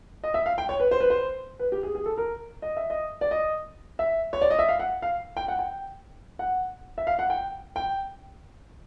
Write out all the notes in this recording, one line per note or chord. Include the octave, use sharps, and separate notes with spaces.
D#5
E5
F5
G5
C#5
B4
C5
B4
C5
B4
G4
G#4
G#4
A4
A#4
D#5
E5
D#5
D5
D#5
E5
C#5
D5
D#5
E5
F5
F#5
F5
G5
F#5
G5
F#5
E5
F5
F#5
G5
G5